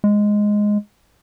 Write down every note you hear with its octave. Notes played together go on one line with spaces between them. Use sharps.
G#3